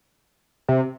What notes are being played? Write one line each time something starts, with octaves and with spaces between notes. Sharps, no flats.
C3